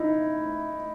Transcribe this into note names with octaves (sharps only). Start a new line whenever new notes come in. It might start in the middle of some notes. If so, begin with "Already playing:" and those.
Already playing: D#4 E4